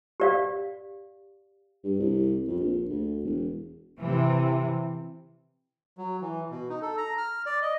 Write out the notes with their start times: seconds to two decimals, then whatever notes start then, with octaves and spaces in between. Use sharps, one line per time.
0.20 G4 D5 F5
1.84 G2
1.99 C2
2.48 F2
2.60 A#1
2.89 D2
3.24 E1
3.98 C3 E3
5.98 F#3
6.21 E3
6.51 B2
6.69 D#4
6.82 A4
6.97 A#5
7.18 F6
7.46 D5
7.62 D#5